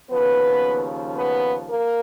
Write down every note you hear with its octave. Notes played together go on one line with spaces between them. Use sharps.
D#2 C#3 F3 B3 B4
B3 B4
A#3 A#4